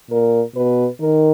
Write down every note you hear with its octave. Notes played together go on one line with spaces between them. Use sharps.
A#2 A#4
B2 B4
D#3 A#4